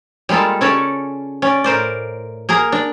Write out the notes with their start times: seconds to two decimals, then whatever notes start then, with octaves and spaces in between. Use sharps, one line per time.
0.29 G3 G#3 A#3 F4 A4
0.61 C#3 C#4 A4 C#5 D5
1.42 C#4 D5
1.64 A2 A#4 C5 D5
2.49 A#3 G#4 A#4 A#5
2.72 D4